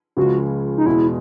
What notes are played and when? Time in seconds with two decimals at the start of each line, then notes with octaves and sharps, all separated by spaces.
0.17 C#2 C#3 F3 G#3 F#4
0.77 D#4
0.86 E2 B2 G#3 E4